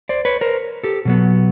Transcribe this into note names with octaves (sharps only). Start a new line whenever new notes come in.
C5 D5
B4 C#5
A#4 C5
G4 A4
B2 F#3 B3